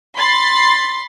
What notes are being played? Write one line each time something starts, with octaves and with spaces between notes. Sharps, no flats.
B5 C6 A6 C7